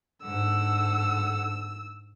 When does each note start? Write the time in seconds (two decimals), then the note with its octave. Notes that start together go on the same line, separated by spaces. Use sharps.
0.23 G#2 D3 F#5 E6